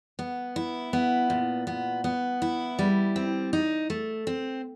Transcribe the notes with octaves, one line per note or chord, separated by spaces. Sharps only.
B3
E4
B3
A#2
B3
B3
E4
G3
C4
D#4
A3
C4